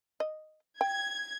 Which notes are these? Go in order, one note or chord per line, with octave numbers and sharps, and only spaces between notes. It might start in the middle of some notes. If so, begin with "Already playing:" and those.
D#5
G5 G#6